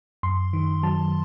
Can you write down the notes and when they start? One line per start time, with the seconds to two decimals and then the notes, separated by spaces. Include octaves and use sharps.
0.23 F#2 C6
0.53 D#3
0.83 F#3 A5